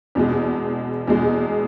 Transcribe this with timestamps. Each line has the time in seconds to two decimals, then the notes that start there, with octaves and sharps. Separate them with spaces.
0.15 E2 B2 G#3
1.07 E2 B2 G#3